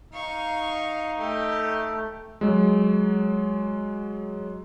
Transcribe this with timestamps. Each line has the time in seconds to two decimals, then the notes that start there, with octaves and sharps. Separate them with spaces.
0.13 D#4 F5 C#6
1.19 A3 G4
2.41 F#3 G#3